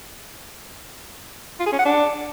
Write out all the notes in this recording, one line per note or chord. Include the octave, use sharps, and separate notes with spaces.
F4
G#4
C#4
F#5
D4